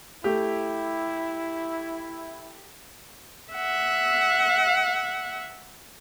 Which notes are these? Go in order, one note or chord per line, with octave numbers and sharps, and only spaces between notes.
A3 E4 G4
E5 F#5